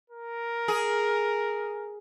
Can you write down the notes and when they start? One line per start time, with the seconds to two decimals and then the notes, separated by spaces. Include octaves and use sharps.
0.10 A#4
0.68 G#4